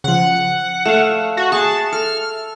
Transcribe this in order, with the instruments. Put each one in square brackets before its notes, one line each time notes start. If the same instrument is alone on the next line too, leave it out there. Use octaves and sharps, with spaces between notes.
[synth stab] C#3 F3 [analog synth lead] F#5
[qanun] A3 C#5 F5 [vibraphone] E5
[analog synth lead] F#4
[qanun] G#4 C#6 [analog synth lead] A5
[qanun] A4 [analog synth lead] F6